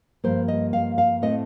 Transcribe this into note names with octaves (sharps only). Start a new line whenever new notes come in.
G2 F3 A#3 C5
D#5
F5
F5
A2 A3 C4 D#5